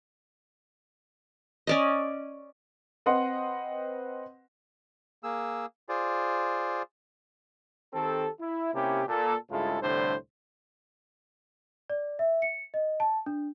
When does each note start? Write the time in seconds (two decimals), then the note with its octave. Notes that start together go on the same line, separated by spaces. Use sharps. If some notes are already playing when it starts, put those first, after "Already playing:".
1.67 C#4 D5 D#5
3.06 C4 B4 D#5 F#5 C6
5.23 A#3 G#4 E6
5.89 F4 G#4 C5 D5
7.94 D#3 C4 G4 A4
8.40 E4
8.74 C3 A#3 C#4 E4 G4
9.08 A#2 A4
9.50 G2 C#3 G#3 E4 F4 A4
9.81 C2 A2 D3 G3 D4 C5
11.90 D5
12.19 E5
12.42 C#7
12.74 D#5
13.00 A5
13.26 D4